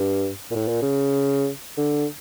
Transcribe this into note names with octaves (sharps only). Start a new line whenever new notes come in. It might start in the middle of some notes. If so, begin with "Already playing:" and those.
Already playing: G2
A#2
A2
A#2
C#3
D3